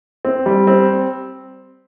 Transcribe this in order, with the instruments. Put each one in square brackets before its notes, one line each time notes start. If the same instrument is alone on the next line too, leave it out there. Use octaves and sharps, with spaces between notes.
[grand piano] C4
G3
C4